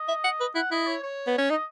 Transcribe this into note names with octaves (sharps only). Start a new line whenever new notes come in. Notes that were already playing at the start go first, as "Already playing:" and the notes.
Already playing: D#5
E5
F#5
B4
E4 F#5
E4 D#5
C#5
C#5
B3
C#4
D#4 D#5